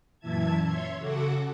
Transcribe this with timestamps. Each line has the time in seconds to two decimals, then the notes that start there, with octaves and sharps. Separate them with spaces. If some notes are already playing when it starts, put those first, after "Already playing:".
0.19 F#2 A#2 E3 E5 A5 G#6
0.63 C#5 E5 C6 G#6
0.97 C#3 F#4 A4 F#5 D6